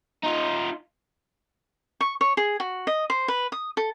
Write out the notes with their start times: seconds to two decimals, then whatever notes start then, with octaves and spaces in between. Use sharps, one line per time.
0.23 D#4 F4
2.01 C#6
2.21 C#5
2.37 G#4
2.60 F#4
2.87 D#5
3.10 C5
3.28 B4
3.52 D#6
3.77 A4